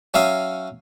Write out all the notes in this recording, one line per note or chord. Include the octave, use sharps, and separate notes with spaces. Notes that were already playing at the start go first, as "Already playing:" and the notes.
F#3 C#4 E5 F5 D#6